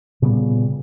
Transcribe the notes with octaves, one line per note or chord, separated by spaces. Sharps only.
A#2 C#3 G3 B3